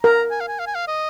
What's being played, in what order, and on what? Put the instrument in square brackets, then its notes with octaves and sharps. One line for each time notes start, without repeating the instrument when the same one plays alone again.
[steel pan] A#4 [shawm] A#5
[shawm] G#5
F5
G#5
F5
G#5
F5
D#5